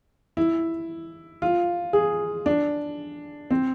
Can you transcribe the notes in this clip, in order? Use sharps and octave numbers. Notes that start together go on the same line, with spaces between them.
E4
F4
G#4
D4
C4